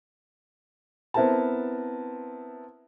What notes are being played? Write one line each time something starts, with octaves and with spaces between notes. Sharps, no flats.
B3 C4 E4 A#4 C5 A5